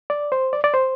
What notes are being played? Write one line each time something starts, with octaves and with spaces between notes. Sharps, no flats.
D5
C5
D5
D5
C5